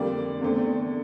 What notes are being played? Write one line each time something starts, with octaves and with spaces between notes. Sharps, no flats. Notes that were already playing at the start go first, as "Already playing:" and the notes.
Already playing: F2 D3 G3 A#3 D5
E2 D3 A3 C4